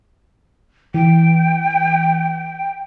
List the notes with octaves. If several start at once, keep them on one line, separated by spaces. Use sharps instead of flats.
E3 G5